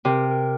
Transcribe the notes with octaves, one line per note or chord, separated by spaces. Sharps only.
C3 A#4
A#4